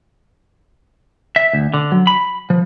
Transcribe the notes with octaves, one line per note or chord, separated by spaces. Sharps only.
E5
D2
D3
F#3
B5
F3